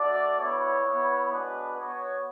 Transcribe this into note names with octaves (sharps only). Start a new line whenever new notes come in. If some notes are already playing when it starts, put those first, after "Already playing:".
Already playing: A3 D4 F#4 D5
B3 E4 C#5
B3 E4
G#3 B3 D4 F#4 B4
B3 F#4 C#5